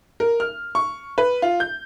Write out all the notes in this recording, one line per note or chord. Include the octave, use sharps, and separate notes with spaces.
A#4
F6
C#6
B4
F4
G6